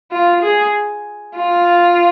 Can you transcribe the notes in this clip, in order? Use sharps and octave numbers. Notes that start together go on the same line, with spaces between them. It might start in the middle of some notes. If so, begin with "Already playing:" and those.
F4
G#4
F4